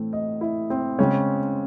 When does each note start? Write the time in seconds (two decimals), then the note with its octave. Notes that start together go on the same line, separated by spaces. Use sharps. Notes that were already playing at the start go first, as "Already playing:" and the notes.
Already playing: A2 E3 A3 C4
0.13 D#5
0.41 E4
0.70 C4
0.99 C#3 G#3 C4 C#4